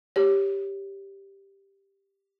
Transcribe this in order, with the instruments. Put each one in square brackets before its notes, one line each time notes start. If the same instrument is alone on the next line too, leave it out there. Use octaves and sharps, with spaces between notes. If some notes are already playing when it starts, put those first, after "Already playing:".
[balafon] G4 C#5